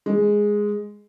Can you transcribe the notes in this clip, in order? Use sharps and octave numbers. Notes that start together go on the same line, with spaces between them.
G#3